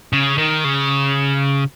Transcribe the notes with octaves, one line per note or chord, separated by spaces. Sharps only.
C#3
D#3
C#3